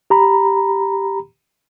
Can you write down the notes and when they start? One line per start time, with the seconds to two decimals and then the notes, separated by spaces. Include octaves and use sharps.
0.10 G4 A#5 B5